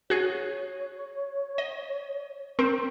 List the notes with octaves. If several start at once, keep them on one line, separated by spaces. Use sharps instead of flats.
F#4 G#4 C#5
D#5
C4 A#4